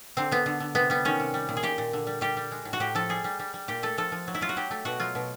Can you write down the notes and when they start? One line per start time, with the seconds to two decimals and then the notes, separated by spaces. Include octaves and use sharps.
0.17 D3 C4
0.31 D3 B3
0.46 D3
0.60 D3
0.75 C3 B3
0.90 G3 B3
1.05 D#3 C#4
1.20 C3
1.34 G3
1.49 A#2
1.57 G#4
1.63 A#2 G4
1.78 A#2
1.93 D3
2.07 G3
2.21 G3 G4
2.37 G3
2.52 G#3
2.65 A2
2.73 F#4
2.80 A2 G4
2.95 F3 A4
3.09 G3 G#4
3.24 G3
3.39 G3
3.54 G3
3.68 A#2 G4
3.83 A3 A4
3.97 F3 A4
4.12 F3
4.28 F#3
4.34 E4
4.41 F#3 F4
4.49 F#4
4.56 F#3 G4
4.71 A3
4.85 B2 F#4
5.00 F#3 F4
5.15 B2